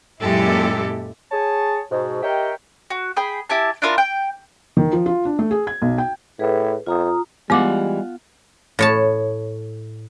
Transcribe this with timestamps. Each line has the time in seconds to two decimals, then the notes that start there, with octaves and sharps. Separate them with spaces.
0.21 F#2 A#2 G#3 E4 G4 A4
1.32 G#4 C#5 A5
1.91 G#2 B2
2.23 G4 A#4 C#5 D#5 E5 G5
2.90 F#4
3.16 G#4 G5 B5
3.50 E4 G4 G#5 A5
3.82 D4 E4 F4 A#4
3.98 G5
4.77 D#3
4.93 F3
5.06 F4
5.25 D4
5.39 A3
5.51 G#4
5.67 G#6
5.82 B1
5.98 G5
6.39 A2 G#4 B4
6.86 F2 F4 A#5 D#6
7.50 E3 G3 G#3 B3 F4 F5 F#5 D6
8.79 A2 C#5 A5